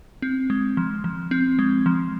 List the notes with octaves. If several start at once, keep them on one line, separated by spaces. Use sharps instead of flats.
C4
G#3
F3
F3
C4
G#3
F3